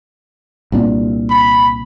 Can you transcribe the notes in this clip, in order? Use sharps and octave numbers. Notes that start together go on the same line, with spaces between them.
C2 A#2 D4
B5